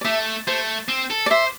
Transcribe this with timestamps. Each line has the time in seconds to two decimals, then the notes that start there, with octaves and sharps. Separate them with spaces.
0.01 D5
0.05 A3 E5
0.47 A3 C5
0.88 C4
1.10 A4
1.26 D5
1.31 C5 E5